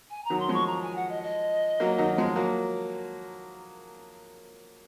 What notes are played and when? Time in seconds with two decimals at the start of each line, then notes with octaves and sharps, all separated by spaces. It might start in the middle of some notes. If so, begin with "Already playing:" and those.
0.11 G#5
0.25 A#5
0.30 D#3 F#3
0.40 C6
0.48 F3 G#3 C#6
0.67 A#5
0.82 G#5
0.96 F#5
1.09 D#5
1.23 D#5
1.80 F#3 A#3
1.98 D#3 F#3
2.18 F3 G#3
2.36 F#3 A#3